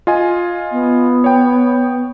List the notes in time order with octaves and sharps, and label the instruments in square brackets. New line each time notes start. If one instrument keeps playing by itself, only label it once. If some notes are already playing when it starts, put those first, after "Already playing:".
[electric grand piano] F4 D#5 G#5
[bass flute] B3
[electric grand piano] C#5 G5